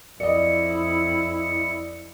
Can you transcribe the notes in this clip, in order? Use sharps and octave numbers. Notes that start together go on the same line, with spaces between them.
F2 E4 D5 D#5 C#7